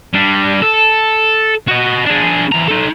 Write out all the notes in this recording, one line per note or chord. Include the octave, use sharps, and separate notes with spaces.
G3 D4
A4
F#4 D#5
D4 G#4
E2 A#5
D#4 A4